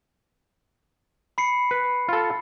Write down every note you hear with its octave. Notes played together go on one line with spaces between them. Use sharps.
B5 C7 C#7
B4
F4 A4